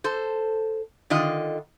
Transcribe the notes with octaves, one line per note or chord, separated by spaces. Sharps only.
A4 C5
D3 D#3 F4 D#5